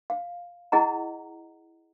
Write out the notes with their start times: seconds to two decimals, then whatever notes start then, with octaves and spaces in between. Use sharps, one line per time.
0.10 F5
0.72 E4 G#4 D#5 F#5 A#5